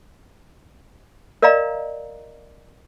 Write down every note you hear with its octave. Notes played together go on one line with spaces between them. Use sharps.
A#4 D5 D#5 F5 A#5